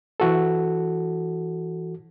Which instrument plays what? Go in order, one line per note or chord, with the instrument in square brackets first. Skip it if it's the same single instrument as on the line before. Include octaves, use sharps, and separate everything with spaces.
[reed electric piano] E3 F#4 A4